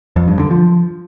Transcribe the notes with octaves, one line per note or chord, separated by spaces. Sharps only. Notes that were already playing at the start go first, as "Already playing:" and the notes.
F2
G2
D3
F3